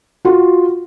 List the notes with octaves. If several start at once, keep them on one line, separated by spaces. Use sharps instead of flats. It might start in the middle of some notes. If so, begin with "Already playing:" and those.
F4 F#4